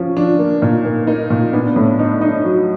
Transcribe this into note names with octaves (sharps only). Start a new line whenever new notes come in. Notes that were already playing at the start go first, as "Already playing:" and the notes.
Already playing: F3 C#4
F3 D4
A#3
A#2 D#4
A#3
A#3 D#4
A#2
B3 D4
A2
D4 D#4
D#4
F#3